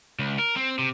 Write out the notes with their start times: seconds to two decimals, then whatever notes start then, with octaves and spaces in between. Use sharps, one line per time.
0.19 C#2
0.39 A#4
0.56 C4
0.79 C3